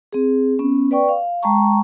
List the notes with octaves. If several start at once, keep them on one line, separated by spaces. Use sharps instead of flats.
C4 G#4
B3 C#4
B4 D5 G5 C#6
F5
G#3 G5 A5 A#5 C#6